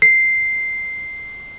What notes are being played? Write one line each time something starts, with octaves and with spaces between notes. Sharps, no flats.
C7